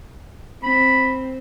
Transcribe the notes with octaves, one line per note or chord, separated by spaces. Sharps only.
C4 B5